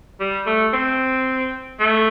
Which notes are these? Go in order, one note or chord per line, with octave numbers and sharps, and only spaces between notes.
G3
A3
C4
A3